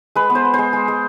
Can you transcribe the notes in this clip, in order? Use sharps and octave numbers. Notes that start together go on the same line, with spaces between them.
G#3 B4
B3
C5
B3
C5
G#3
G#3
G#3